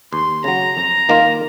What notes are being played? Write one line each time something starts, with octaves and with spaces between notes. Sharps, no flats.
D#2 C6
C#3 F#3 A#5
F2 A#5
D#3 A#3 F4